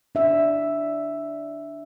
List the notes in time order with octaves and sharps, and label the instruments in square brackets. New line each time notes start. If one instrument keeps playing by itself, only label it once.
[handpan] D4 E5